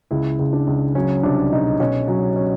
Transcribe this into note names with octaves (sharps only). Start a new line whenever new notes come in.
C#2 E4
C#2
D4
C#2
F#3 C#4
C2 D4
B2 D#4
B2 C#4
F#3 C#4
C#4